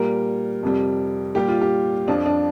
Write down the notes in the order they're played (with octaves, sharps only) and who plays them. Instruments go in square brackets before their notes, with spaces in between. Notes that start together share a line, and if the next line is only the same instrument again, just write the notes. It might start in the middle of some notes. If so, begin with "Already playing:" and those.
Already playing: [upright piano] A#2 G3 A#4
F2 C3 G3
A#2 G3 G4
F4
G4
F2 F3 D4
D4